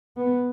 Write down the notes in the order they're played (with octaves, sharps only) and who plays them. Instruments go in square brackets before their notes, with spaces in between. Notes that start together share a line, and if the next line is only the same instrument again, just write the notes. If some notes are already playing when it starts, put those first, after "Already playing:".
[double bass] B3